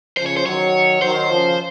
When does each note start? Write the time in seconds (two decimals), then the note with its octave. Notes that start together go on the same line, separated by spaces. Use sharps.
0.17 C#3 F3 C5
0.26 C#5
0.37 C5
0.45 D#3 F#3 C#5
1.02 D#3 F#3 C5
1.30 C#3 F3